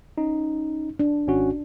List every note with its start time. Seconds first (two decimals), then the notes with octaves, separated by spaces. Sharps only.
0.18 C#4 D#4
0.99 D4
1.27 G#1 C#4 F#4